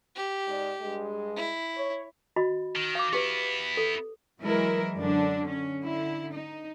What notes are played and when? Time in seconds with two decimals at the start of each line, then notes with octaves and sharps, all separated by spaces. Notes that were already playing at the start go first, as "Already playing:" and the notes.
0.15 G4
0.47 G#2 D5
0.81 G2 G#3
1.36 E4
1.75 C#5
2.36 F#4 D#5 B5
2.75 D#3
2.95 F5 D6
3.13 B3 E4 G4 B4
3.77 A4
4.42 E3 F#3 G#3 E4 A#4
4.94 F#2 D3 D4
5.48 C#4
5.81 D3 E4
6.31 D#4